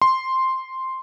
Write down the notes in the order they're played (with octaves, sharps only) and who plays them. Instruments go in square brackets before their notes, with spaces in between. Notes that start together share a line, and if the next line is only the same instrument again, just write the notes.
[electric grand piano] C6